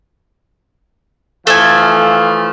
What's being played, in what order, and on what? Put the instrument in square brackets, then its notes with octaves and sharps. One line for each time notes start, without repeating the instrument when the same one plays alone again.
[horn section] E3 F3 A3 [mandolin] A4 E5 G#5 [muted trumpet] F5